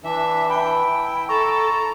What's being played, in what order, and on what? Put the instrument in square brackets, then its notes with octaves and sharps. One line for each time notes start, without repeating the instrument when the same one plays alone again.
[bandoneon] E3 [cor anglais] D4 [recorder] E5
[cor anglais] E4 [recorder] G5 [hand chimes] A5 B5
[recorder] A4 [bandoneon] A#5 [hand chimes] C#6